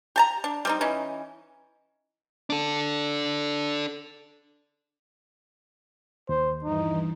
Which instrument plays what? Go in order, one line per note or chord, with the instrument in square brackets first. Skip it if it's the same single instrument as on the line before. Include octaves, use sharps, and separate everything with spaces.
[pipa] G4 A5 A#5
D4
G3 C4 D#4
E3 C#4 D#4
[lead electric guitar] D4 A4
[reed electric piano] D#2 [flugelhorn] C5
[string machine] G2 E3 [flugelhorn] D#4